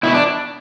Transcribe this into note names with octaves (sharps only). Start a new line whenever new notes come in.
B2 E4
D4